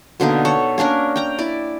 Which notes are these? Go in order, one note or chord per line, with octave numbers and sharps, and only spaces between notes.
B2 D3 A#3 D#4
A4 C#5 F#5
A#3 C#4 D4 A#4
G5 A#5
E4 D5